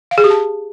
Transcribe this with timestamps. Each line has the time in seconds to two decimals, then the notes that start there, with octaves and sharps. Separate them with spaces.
0.11 F5
0.18 G#4
0.24 G4
0.30 A5